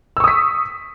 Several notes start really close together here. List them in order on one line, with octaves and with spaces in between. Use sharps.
E6 C#6 D#6 B6